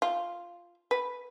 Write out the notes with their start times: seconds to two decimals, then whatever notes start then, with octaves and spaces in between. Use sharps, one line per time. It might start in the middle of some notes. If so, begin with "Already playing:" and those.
0.02 F4
0.91 B4